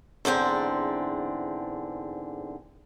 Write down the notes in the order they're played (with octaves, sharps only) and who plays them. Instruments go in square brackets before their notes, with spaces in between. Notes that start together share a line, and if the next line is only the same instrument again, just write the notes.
[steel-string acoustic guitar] E2 G#2 D3 C4